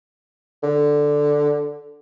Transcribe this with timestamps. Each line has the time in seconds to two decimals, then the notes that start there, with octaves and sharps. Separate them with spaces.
0.63 D3